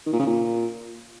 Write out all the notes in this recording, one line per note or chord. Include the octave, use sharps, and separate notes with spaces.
D#3
A#2
C#3
A#2